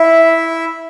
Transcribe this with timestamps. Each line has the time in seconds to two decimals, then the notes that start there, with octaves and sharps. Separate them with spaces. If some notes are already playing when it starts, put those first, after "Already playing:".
Already playing: E4 E5